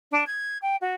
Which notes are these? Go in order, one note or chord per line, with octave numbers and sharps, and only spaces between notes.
D4
G#6
G5
F#4